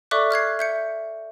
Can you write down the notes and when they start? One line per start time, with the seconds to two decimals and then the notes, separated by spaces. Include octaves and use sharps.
0.11 A4 D5 E5 C#6 D6 F#6
0.31 F6 F#6 G#6 C7
0.59 E5 G6 C#7